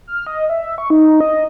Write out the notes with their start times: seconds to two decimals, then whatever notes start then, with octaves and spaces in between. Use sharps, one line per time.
0.07 F6
0.27 D#5
0.50 E5
0.78 C#6
0.90 D#4
1.20 D#5